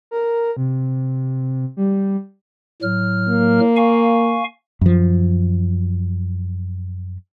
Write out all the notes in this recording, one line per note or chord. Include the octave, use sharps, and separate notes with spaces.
A#4
C3
G3
A2 F#3 F6
A#3
F5 G#5 C#6
F#2 F3